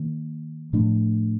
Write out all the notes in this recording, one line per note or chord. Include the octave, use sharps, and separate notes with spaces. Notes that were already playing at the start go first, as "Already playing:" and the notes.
Already playing: D#3 A#3
A2 F3 A3 D4